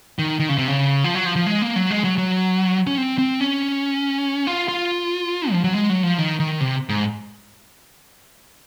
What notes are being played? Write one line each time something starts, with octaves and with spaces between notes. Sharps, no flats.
D#3
D#3
C#3
C3
C#3
F3
F#3
F3
F3
G#3
A#3
F#3
G#3
F#3
F#3
C#4
C4
C4
C#4
F4
F4
F3
F#3
G#3
F#3
F3
D#3
D#3
C3
G#2